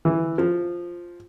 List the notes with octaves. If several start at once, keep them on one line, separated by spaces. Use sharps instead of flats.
E3
F3